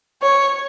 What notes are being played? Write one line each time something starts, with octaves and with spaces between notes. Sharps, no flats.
C#5